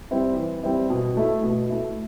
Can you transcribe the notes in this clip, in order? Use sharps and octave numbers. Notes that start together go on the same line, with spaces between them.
G3 C4 E4
E3
G3 C4 E4
B2
A3 E4
B2
A3 E4